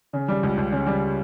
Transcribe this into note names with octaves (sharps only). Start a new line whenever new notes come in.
C#3
G3
C#2
C#2
C#3
G3